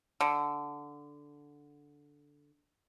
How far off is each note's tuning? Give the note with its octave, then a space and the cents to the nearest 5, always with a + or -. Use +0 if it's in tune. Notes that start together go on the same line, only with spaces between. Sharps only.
D3 -5